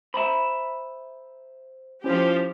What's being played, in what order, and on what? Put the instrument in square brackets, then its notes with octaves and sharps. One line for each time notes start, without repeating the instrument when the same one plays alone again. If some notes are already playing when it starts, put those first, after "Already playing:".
[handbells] C5 [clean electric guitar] E5 A#5 B5
[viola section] F3 G4 [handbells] C#4 E4 C5